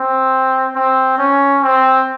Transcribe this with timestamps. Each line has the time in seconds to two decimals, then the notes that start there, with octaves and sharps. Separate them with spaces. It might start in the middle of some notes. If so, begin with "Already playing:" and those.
Already playing: C4
0.75 C4
1.18 C#4
1.62 C4